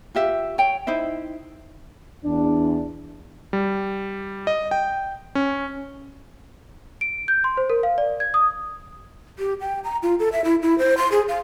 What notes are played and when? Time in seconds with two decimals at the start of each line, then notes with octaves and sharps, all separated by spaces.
0.15 F4 G4 E5
0.58 C#5 G5
0.87 D#4 E4 C5 E5
2.23 E2 D4
3.53 G3
4.47 D#5
4.71 G5
5.35 C#4
7.01 D7
7.28 G6
7.44 C6
7.57 C5
7.70 A#4
7.83 F5
7.98 D5
8.20 G#6
8.34 D#6
9.39 G4
9.61 G5
9.84 A#5
10.03 F4
10.19 A4
10.32 E5
10.44 E4
10.62 E4
10.78 C5
10.98 C6
11.12 G#4
11.28 F5